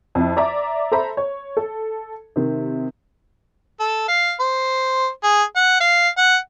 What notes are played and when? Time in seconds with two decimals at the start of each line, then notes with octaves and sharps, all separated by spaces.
0.15 F2 E4
0.37 D5 E5 A#5 D6
0.92 A4 C5 E5 A#5 B5
1.17 C#5
1.57 A4
2.36 C3 D#3
3.80 A4
4.08 F5
4.40 C5
5.23 G#4
5.56 F#5
5.80 F5
6.17 F#5